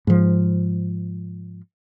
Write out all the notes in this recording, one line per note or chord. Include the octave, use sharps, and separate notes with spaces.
G#2 F3